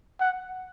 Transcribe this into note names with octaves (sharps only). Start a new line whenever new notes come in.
F#5